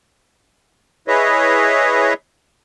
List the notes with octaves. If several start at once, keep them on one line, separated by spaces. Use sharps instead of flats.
E4 G#4 B4 C#5 D#5 E5